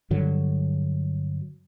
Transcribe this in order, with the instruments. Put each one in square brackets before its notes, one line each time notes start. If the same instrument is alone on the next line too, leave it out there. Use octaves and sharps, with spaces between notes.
[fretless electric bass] G2 D3 F#3